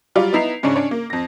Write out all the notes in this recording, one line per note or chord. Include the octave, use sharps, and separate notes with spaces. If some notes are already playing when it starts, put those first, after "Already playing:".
F#3 G3 F4 D5
B3 D#4 E4 A#5 C7 F7
G#2 C#3 C#4 D4
C#4 D4 C#5
A#3
F2 A#6